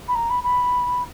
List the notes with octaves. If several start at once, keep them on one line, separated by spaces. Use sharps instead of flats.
B5
A#5
B5
B5